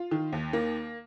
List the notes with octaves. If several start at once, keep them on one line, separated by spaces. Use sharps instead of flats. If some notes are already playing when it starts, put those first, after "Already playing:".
Already playing: F4
D#3
D#2
A#3